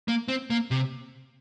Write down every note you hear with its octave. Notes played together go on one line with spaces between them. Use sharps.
A#3
C4
A#3
C3